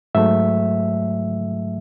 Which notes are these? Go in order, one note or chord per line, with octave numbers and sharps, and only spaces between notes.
G#2 F#3 A3 E5